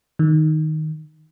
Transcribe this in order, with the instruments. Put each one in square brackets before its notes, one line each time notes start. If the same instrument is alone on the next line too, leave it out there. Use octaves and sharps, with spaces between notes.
[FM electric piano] D#3